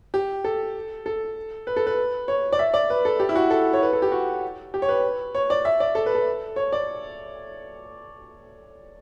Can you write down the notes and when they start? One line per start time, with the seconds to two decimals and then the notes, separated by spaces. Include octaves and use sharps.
0.14 G4
0.44 A4
1.06 A4
1.67 B4
1.76 A4
1.86 B4
2.28 C#5
2.52 D5
2.59 E5
2.74 D5
2.90 B4
3.05 A4
3.20 G4
3.29 E4
3.35 F#4
3.50 A4
3.73 C#5
3.82 B4
3.93 A4
4.02 G4
4.12 F#4
4.74 G4
4.82 C#5
4.89 B4
5.35 C#5
5.50 D5
5.65 E5
5.80 D5
5.95 A4
6.06 B4
6.15 A4
6.56 C#5
6.72 D5